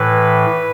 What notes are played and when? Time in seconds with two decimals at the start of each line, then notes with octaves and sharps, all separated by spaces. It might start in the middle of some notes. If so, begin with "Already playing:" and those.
Already playing: A2 E3 B4